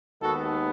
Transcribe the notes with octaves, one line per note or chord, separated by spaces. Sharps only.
D#2 D#3 G#3 B3 F#4 A4